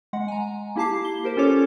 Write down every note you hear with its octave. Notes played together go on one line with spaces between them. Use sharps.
G#3 F#5
G#5 A#5
A#3 E4 G4 A5 D6 C7
G7
G4 A#4 C5
C#4 F4 A4 C#5 D6